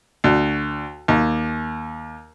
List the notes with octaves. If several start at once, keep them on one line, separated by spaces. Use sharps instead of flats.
D2
D#2